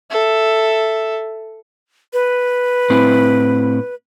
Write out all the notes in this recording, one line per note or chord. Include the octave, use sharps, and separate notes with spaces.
A4 E5
B4
A2 C4 E4